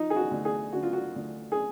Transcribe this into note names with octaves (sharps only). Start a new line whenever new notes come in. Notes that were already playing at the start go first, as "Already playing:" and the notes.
Already playing: F3 D#4
G#4
F#4
D2
G#4
D3 F#4
F4
F#4
D2
G#4